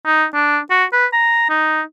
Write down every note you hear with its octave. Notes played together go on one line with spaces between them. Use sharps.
D#4
D4
F#4
B4
A#5
D#4